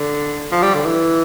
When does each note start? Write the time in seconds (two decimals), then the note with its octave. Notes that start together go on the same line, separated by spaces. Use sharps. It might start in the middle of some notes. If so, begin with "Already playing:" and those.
Already playing: D3
0.52 F3
0.62 G3
0.74 D3
0.85 E3